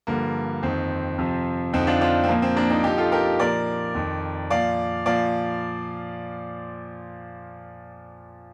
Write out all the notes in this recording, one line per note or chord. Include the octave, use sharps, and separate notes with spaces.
G2 D3 F3 A#3
F2 D#3 C4
F2 C3 F3
F2 D3 F3 C4 D#4
D4 F4
D4 F4
C4
A#2 F3 A#3
C4
A#3 D4
C4 D#4
A#2 F3 D#4 G4
F4 A4
G4 A#4
A#2 F3 A#4 D5
F2 D#3
A#2 F3 D5 F5
A#2 F3 D5 F5